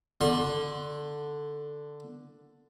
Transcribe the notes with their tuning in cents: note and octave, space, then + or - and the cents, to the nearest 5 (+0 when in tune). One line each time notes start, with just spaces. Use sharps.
D3 +5 C6 +35